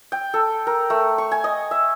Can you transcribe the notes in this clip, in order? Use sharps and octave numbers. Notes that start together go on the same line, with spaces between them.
G5
A4
A#4
A3
C#6
G#5
D#5
E5